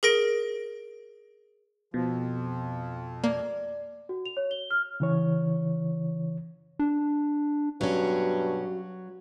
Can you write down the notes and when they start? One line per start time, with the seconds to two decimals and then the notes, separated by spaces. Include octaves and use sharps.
0.03 G#4 A#4 A#6 D7
1.94 F2 B2 F3
3.24 A#3 D5
4.09 F#4
4.26 F7
4.37 C#5
4.51 G7
4.71 F6
5.00 C#3 E3 C#5
6.79 D4
7.81 G2 B2 F#3 C#4 F#4